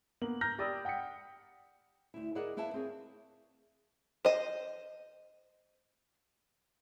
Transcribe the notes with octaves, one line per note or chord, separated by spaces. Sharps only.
A#3 B3 F#7
A#5 F6 G6 A#6
G4 D5 B5 D#6 E6
F#5 G5 D#6 B6 C#7
D2 E4
E4 G#4 A#4 D5 D#5 F#5
B3 E4 B4 F5 A5
C4 G#4 C#5
C5 D#5